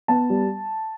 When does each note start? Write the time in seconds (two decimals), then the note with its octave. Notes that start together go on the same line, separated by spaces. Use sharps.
0.08 B3 A5
0.30 G3